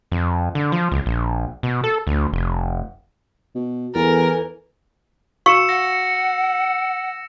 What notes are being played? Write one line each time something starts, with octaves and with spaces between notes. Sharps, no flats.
F2
D3
F3
C#2
A#1
B2
A4
D2
F1
B2
E2 E3 A4 A#4 G#5
F#4 F5 C#6 E6 C#7 E7
F#5 A#6